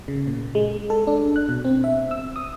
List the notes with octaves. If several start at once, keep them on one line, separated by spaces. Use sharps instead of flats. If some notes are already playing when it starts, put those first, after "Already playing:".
C#3
A#2
G#3
A4
D4
F#6
B2
C4
E5
E6
D#6